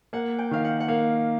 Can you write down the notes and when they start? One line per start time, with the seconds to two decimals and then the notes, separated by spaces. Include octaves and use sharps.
0.13 A#3 F#5
0.39 G5
0.51 D#3 F5
0.64 F#5
0.80 F#5
0.88 A#3 F5